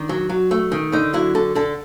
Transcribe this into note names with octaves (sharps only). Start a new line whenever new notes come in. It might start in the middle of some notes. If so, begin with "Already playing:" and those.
Already playing: D#3 D4
F#3
F#3
A3
D#3
D3 D#4
F#3 E4
D3 A4
D3 A4